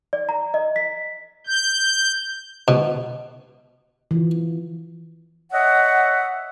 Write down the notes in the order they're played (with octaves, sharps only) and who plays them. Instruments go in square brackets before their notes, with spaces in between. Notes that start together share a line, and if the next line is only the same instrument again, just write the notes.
[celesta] D5
A#5
D#5
B6
[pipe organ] G6
[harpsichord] B2
[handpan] E3 F4
[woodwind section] C#5 D#5 E5 F#5